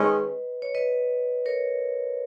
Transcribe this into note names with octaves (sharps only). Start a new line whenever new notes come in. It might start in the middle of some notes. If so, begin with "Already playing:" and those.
Already playing: D#3 G#3 C#4 B4 D#5
C#5
B4 D#5
A#4 C#5